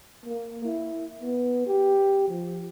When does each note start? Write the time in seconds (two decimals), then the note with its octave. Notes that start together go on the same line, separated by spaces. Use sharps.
0.25 A#3
0.65 E4
1.21 B3
1.67 G4
2.29 F3